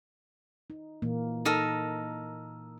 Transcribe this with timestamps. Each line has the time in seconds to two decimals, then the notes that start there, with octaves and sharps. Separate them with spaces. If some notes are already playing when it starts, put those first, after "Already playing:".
0.70 D#4
1.02 A#2 E3 A#3
1.45 D#4 A4 A#4